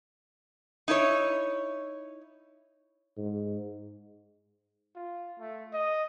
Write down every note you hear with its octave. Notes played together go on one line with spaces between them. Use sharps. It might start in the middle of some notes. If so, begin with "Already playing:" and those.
D#4 E4 A4 C#5
G#2
F4
A3
D#5